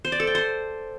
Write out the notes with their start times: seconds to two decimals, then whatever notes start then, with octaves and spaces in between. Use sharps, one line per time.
0.05 C5
0.12 D5
0.20 A4
0.27 G5
0.35 C5